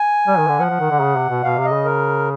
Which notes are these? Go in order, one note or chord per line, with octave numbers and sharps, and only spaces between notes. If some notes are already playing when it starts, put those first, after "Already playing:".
Already playing: G#5
G3
D#3
D3
F3 F#5
F3
D#3
D3
C#3
C3
B2
B2 F5
C3
D#5
C#3
A#4